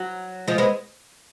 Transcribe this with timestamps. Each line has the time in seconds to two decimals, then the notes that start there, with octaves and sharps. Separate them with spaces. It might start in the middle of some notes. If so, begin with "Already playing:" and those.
Already playing: F#3
0.48 F3 G#3
0.58 G#3 B3